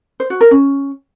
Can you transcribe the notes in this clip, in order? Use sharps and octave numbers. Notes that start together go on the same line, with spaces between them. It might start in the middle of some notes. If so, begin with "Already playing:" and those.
C5
F#4
A#4
C#4